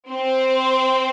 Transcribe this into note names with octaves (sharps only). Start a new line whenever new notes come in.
C4 C5